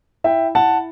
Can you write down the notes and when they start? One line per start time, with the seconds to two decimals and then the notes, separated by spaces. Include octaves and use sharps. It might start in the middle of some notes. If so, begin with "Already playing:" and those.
0.24 E4 E5 G5
0.55 E4 F#5 A5